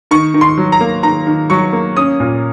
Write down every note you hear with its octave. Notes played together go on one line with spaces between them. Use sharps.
D#3 C#6
D#3
C6
F#3
A#5
A#3
D#3 A#5
D#3
F#3 C#6
A#3
C#4 D#6
A#2